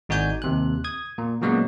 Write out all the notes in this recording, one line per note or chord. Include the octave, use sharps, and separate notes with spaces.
G#1 D#4 F#4 D5 G#5 G6
D#2 C3 F#6
D#6 G#6
A#2
A#2 C#3 F#3 G#3 A#3 B3